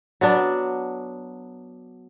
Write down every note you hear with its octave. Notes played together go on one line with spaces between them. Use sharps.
F#3 B3 D4